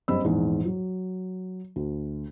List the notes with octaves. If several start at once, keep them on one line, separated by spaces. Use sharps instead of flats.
F#1 G2 C4 D#5 B5 E6
A#1 E2 G#2
F#3
D2